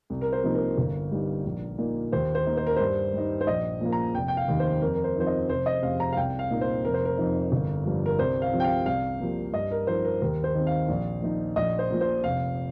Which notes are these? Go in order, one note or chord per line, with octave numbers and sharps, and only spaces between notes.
C2
A#4
C5
C3 F3 A#3 D#4
A#4
G1
G2 G3 D#4
A#1
A#2 A#3 D#4
D#2 C5
C5
D#3 A#3 D#4
C5
A#4
G2 C5
G3 D#4
C5
A#1 D#5
A#2 F3 A#3
A#5
F1 G5
G5
F5
D#2 D#3
C5
F2 A#4
A#4
C5
F3 C4 D#4 C5
D#5
F1 C5
D#5
F2 C3 F5
A#5
F5
C2 G5
F5
A#2 A#3 D#4
C5
F1 A#4
C5
A#4
F2 F3 D#4
G1
G2 F3
A#4
C2 C5
F5
C3 F3
G5
F5
C2 F5
C3 F3 A#3
G2 D#5
A#4
F3 D#4 C5
A#4
D#2 A#4
C5
D#3 C4
F5
A#1
A#2 F3 D#4
A#1 D#5
C5
A#2 F3 A#3
C5
F1 F5